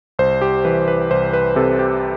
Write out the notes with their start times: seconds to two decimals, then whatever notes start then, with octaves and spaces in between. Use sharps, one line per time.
0.19 C2 C5
0.41 G4
0.65 E3 B4
0.88 B4
1.11 C2 C5
1.33 B4
1.56 C3 A4
1.79 G4